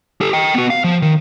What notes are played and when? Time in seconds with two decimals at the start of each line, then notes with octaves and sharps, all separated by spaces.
0.21 G4 A4
0.33 D#5 G5
0.54 B3 F#4
0.70 F5
0.84 F3
1.02 D#3